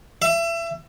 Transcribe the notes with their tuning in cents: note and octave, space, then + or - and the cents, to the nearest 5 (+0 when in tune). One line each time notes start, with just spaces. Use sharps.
E5 +30